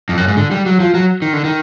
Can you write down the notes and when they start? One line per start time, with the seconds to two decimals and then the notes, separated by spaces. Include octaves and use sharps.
0.09 F2
0.18 F#2
0.28 G#2
0.37 D3
0.51 G3
0.66 F#3
0.80 F3
0.94 F#3
1.22 D#3
1.33 D3
1.45 D#3